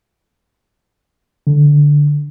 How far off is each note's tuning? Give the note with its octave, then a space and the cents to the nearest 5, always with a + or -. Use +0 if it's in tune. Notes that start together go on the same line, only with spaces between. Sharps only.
D3 -5